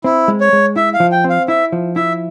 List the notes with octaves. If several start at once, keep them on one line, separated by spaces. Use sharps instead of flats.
C4 E4
G#3
C#5
G#3
E4 E5
F5
F3
G5
C4
F5
E4 E5
F3
E4 E5